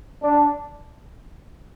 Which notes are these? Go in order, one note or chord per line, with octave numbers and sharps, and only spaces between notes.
D4